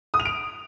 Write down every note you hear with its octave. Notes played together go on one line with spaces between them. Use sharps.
D#6
F7
D7